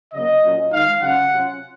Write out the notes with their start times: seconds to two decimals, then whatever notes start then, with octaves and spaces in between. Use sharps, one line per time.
0.13 C#3 F#3 A#3 D#5
0.43 A#2 F#3 C#4 F4
0.71 D#3 G#3 D#4 F5
1.00 C#3 F#3 C#4 F4 F#5
1.29 C3 F#3 C#4 F4